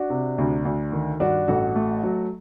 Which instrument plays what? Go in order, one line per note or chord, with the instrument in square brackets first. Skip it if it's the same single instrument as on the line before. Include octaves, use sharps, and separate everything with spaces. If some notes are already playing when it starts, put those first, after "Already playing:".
Already playing: [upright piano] D4 F#4
[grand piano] C3
D2
D2
D#3
[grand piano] G2 [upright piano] D4 F#4
[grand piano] A1 [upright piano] F#4 A4
[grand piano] A3
F#3